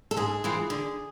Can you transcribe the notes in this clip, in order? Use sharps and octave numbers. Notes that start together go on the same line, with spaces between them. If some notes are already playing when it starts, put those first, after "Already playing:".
A4
G#2 G#4
E3 G#3 C4 F4
D3